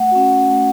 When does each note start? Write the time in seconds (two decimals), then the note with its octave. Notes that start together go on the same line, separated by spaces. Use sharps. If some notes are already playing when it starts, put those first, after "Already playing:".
Already playing: A3 F#5
0.11 C#4 F#4
0.50 A3